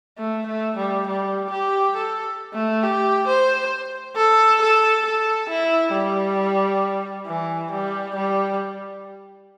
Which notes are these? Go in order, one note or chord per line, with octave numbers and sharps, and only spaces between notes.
A3
A3
G3
G3
G4
A4
A3
G4
C5
A4
A4
A4
E4
G3
E3
G3
G3